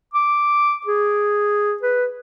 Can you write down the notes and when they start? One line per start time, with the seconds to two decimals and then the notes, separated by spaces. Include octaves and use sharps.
0.14 D6
0.86 G#4
1.82 B4